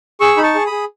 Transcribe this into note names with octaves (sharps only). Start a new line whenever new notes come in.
G#4 C#6 E6
D#4 B5
A5 C#6
G#4
G#4 B5 D#6